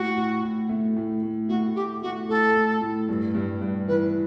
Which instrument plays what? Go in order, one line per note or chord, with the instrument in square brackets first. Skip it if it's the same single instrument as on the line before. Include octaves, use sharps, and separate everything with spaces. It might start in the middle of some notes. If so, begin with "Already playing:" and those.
Already playing: [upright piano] A2 [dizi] F#4
[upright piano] A2
A2
A3
A2
A3
[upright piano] A3 [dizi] F#4
[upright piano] A2 [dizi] G4
[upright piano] A3 [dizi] F#4
[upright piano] A2 [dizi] A4
[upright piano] A2
A2
G2
G2
G2
[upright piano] E3 [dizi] B4